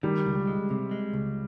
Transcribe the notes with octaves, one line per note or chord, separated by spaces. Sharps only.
D#3 G3
C#2
G#3
C3
G#3
C#2